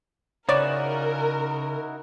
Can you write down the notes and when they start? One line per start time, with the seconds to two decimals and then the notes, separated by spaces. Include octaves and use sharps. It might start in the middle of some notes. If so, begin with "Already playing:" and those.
0.49 C#3 D#4 E4 F#4 A#4 C#5 D5